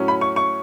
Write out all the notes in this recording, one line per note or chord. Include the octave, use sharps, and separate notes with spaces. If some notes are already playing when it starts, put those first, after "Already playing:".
Already playing: A2 F#3 C#4
B5
C#6
C#6